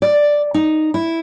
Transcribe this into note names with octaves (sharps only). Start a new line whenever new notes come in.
D5
D#4
E4